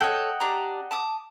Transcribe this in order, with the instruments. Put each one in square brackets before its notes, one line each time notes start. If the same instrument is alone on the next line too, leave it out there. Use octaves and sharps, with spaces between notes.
[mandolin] A4 C#5 [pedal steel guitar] D#5 F#5 G5
[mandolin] D4 G4 A#5
A5 D6 D#6